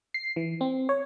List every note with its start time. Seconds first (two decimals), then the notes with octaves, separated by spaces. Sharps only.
0.14 C7
0.36 E3
0.61 C4
0.89 C#5